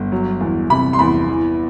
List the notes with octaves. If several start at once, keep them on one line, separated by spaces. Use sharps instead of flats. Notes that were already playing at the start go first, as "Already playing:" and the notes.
Already playing: G1
F#3
E2
C3 B5
C6
E2 B5
E3